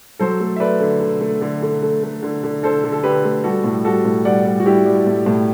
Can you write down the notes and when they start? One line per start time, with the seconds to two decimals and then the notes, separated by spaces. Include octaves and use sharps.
0.19 F#3 A4 C5
0.40 A3
0.56 E5
0.60 A3 B4 D5
0.80 D3
1.00 D3
1.21 A3
1.41 D3
1.62 D3
1.82 A3
2.03 A3
2.23 D3
2.44 D3
2.63 D3 A4 C5
2.84 D3
2.92 A4
3.03 D3 G4 B4
3.24 A3
3.44 G3 F#4 A4
3.64 A2
3.85 G3 F#4 A4
4.05 A2
4.25 G3 D5 F#5
4.45 G3
4.60 F#4
4.66 G3 E4 G4
4.86 G3
5.06 A2
5.26 A2